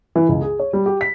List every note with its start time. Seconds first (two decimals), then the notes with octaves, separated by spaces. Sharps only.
0.16 E3
0.29 C#2
0.41 G#4
0.59 C#5
0.73 G3
0.86 G4
1.01 B6